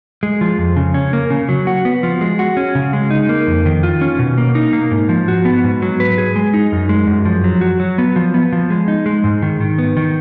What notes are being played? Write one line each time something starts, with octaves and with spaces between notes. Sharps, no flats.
G#3
F3
F2
C#3
C#4
A#3
C#3
F#3
F#4
B3
F3
G#3
F#4
C#4
C#3
G#3
D#4
A#3
F2
D#3
F4
C#4
B2
A#3
D#4
A#3
G#2
F3
F#4
B3
G#2
F#3
B4
G#4
G#3
D#4
F#2
G#3
F#2
F3
F#3
F#4
F#3
B3
F3
B3
F3
G#3
D#4
G#3
G#2
D#3
D#3
B3
D#3